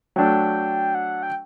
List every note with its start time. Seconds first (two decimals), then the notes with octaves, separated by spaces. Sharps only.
0.16 F#3 A3 D4 G5
0.95 F#5
1.23 G5